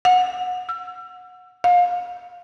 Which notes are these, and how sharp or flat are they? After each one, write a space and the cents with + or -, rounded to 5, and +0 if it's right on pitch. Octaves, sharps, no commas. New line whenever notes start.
F#5 -25
E6 +40
F5 +30